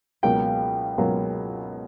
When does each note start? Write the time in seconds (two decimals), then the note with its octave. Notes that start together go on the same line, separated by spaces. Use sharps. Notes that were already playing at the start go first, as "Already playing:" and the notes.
0.23 C#2 B2 F#3 A#3 G5
0.98 C#2 B2 F#3 A#3